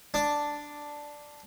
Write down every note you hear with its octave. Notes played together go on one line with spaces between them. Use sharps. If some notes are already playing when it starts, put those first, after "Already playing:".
D4